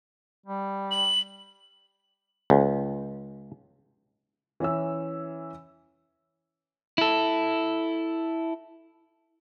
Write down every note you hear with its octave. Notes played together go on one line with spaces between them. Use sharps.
G3
F#7
C#2
E3 C#4 E5 E6
E4 A4